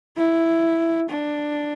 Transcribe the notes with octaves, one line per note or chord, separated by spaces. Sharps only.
E4
D4